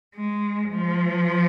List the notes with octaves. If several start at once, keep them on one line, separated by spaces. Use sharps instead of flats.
G#3
F3